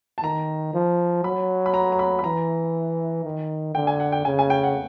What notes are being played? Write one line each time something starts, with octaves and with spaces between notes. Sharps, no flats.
A5
D#3 A#5
F3
F#3 B5
B5
A#5
A#5
B5
B5
E3 A#5
D#3
D3 G5
G#5
F#5
G5
C#3 G#5
G#5
G5
F#5